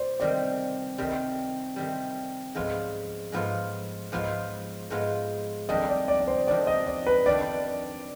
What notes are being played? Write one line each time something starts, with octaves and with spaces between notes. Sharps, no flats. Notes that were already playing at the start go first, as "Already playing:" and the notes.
Already playing: C5 D5
C3 D#3 G3 D5
C3 D#3 G3
C3 D#3 G3
G#2 F3 G#3 B3 F4
G#2 F3 G#3 B3 F4
G#2 F3 G#3 B3 F4
G#2 F3 G#3 B3 F4
F2 D#3 G3 D4 D#5
D5
D5
D5
C5
F2 D#3 G3 D4 D5
D#5
D5
B4
F2 D#3 G3 D4 D5